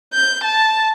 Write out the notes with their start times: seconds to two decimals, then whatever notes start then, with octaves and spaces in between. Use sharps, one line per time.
0.14 G6
0.44 A5